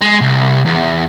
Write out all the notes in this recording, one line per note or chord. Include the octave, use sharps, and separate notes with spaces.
G#3
C2
E2